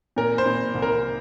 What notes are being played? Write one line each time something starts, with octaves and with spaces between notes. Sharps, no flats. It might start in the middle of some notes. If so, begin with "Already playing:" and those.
A#2 A#4
C5
A#2
C2
A#4